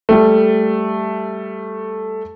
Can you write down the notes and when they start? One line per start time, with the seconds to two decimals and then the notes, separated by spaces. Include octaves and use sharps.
0.09 G3 A3